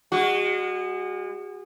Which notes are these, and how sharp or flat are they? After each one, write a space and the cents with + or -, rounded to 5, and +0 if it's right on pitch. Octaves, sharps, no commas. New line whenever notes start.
G#3 -35 F#4 +0